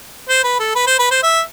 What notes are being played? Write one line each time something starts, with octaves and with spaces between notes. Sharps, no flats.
C5
B4
A4
B4
C5
B4
C5
E5